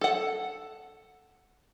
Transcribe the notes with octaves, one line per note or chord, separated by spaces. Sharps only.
A4 F#5